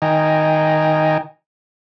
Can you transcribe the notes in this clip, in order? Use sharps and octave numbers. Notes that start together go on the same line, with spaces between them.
D#3 D#5 G5 G#5 A#5